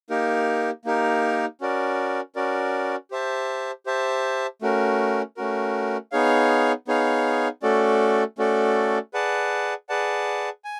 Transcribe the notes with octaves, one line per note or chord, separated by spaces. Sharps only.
A#3 D#4 G4 A#4
A#3 D#4 G4 A#4
C#4 F#4 A#4 D5
C#4 F#4 A#4 D5
G4 C5 E5 A5
G4 C5 E5 A5
A3 C#4 F#4 A#4
A3 C#4 F#4 A#4
B3 D#4 G#4 C#5 F5
B3 D#4 G#4 C#5 F5
A3 C#4 F#4 A4 D5
A3 C#4 F#4 A4 D5
G#4 B4 D5 F#5 A5
G#4 B4 D5 F#5 A5
G#5